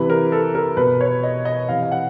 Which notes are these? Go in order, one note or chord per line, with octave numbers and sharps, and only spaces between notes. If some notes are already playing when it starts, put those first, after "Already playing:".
Already playing: C3 E3 B4
A#4
A4
A#4
B2 B4
C#5
D#5
D#5
C3 E3 F5
F5
F#5